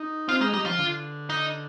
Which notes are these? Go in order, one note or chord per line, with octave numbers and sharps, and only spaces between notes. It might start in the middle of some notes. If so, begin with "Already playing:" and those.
Already playing: D#4
C4 F4
G#3 D#4
G3 D#4
F3 F4
D3
D#4